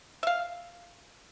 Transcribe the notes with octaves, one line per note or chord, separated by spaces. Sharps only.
E5 F5